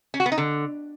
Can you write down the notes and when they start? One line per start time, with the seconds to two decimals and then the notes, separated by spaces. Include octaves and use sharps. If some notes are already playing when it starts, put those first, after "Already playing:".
0.14 C#4
0.20 F#4
0.26 B3
0.32 D#4
0.38 D3